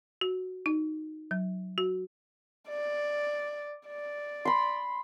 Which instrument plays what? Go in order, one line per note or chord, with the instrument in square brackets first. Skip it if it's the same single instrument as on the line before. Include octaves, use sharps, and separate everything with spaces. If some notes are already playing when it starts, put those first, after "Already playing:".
[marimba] F#4
D#4
F#3
F#4
[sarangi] D5
D5
[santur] B5 C6